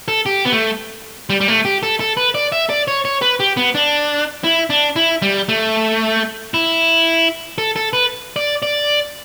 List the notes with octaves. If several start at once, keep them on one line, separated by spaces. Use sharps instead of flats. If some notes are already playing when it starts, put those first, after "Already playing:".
A4
G4
B3
A3
G3
G3
A3
G4
A4
A4
B4
D5
E5
D5
C#5
C#5
B4
G4
B3
D4
E4
D4
E4
G3
A3
E4
A4
A4
B4
D5
D5